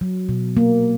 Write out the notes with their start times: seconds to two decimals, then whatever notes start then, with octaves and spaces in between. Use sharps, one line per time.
0.01 F#3
0.29 B2
0.57 A#3